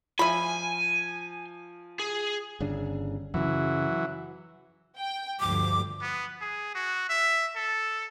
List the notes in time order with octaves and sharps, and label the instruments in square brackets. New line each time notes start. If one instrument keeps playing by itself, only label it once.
[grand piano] F3 [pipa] E5 B5 [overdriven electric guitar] G#5
[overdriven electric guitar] G#4
[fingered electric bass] G1 C#3 D4
[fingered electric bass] F#2 C#3 [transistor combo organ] E3 F#3
[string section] G5
[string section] D2 G2 F3 [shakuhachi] D6
[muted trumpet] B3
G#4
F#4
E5
A4